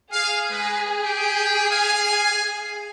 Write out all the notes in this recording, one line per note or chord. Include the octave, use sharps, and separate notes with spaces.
G#4 F5
G#3 B4
G4 G5
F5 G#5